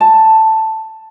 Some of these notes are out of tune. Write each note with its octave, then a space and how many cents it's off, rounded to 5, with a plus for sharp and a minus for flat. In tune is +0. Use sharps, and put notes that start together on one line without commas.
A5 +5